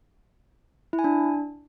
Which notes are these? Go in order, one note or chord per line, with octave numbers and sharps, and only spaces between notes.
E4
G#5
D4